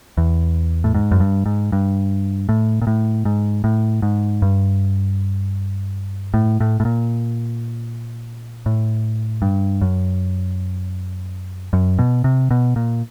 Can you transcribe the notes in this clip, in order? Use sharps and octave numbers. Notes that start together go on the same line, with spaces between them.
E2
A2
G#2
F#2
G2
G#2
G2
A2
A#2
A2
G#2
A2
G#2
G2
A2
A2
A2
A#2
A2
G2
F#2
F#2
B2
C3
B2
A#2